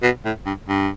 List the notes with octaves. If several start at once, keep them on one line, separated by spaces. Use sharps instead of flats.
B2
A2
G2
G2